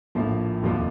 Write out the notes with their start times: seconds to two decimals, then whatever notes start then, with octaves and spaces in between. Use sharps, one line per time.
0.15 A#1 A2 F3 A#3 F4
0.63 F1 D#2 D3 F3 A#3